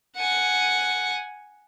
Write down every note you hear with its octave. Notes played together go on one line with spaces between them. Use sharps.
F#5 G#5